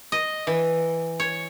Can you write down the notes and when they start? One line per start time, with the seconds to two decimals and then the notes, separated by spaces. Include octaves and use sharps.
0.12 D#5
0.47 E3
1.20 C#5